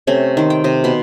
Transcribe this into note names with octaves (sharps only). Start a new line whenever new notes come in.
C3 A3 C#4
D#3 C5
G5
C3 D#5
B2 B5 C6